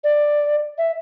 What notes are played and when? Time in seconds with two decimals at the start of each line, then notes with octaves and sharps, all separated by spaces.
0.04 D5
0.78 E5